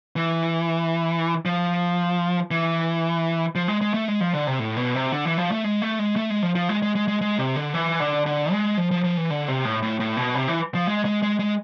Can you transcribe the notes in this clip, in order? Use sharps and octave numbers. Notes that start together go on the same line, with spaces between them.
E3
F3
E3
F3
G#3
G#3
A3
G#3
F3
D3
C3
A2
B2
C3
D3
E3
F3
A3
G#3
A3
G#3
A3
G#3
F3
F3
G#3
G#3
G#3
G#3
G#3
C3
D3
E3
D3
D3
G#3
F3
F3
F3
E3
D3
C3
A2
A2
A2
B2
C3
E3
F3
G#3
G#3
G#3
G#3